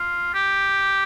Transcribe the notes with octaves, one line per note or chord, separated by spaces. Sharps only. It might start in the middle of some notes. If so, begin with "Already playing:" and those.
Already playing: F4
G4